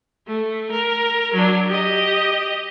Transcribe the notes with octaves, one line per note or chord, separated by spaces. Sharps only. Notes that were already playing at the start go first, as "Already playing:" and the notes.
A3
A#4
F#3 D4
G4 D#5